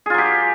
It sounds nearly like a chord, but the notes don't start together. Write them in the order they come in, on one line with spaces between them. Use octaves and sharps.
G#4 F4 F#3 G4